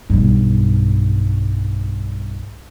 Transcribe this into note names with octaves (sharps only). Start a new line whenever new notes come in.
B1 G2